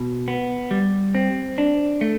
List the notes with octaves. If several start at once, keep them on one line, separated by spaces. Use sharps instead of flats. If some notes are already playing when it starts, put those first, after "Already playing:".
Already playing: B2
B3
G3
C4
D4
A3